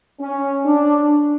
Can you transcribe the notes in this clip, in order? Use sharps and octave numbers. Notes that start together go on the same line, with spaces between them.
C#4
D4